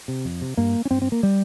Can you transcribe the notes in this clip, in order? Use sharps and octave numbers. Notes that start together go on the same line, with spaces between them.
C3
F2
C3
G2 A#3
C#4
G2 C4
C4
A#3
G3